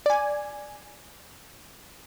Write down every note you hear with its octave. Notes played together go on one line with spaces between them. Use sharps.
D5 G#5